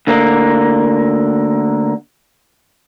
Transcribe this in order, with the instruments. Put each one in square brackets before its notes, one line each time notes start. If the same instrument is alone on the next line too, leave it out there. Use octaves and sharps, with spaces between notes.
[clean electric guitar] D2 D3 A#3